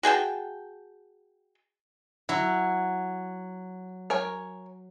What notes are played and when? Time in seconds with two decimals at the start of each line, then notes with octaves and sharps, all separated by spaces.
0.03 F#4 G#4 G5 A5
2.29 F#3 E4
4.10 A#4 C#5 G#5